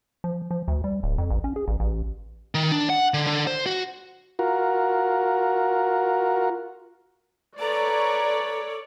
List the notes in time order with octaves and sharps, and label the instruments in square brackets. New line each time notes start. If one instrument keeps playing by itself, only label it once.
[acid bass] F3
F3
D2
G3
D1
F2
A1
C#4
G#4
A1
A1
[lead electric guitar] D#3
D4
F#5
D3
D3
C5
F#4
[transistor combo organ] F4 F#4 A#4
[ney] A4 [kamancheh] B4 A#5 [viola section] C#5 D5